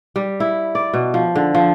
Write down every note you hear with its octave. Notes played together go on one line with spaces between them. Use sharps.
G3
E4
D5
B2
F3
D3
F3